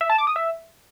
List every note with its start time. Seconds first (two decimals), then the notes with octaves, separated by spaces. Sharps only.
0.01 E5
0.10 A5
0.18 D6
0.27 D#6
0.36 E5